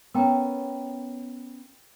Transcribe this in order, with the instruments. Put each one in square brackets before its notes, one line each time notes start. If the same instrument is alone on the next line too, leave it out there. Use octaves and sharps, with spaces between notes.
[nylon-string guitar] B3 C#4 [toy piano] A#4 G5 A#5